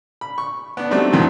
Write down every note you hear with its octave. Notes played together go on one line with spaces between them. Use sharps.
B5
C#6
B3 D4
F#3 G3 A3 C4 D4 D#4
F2 A#2 D#3 E3 F#3